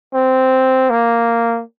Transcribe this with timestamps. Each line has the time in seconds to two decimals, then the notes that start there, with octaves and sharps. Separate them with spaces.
0.14 C4
0.90 A#3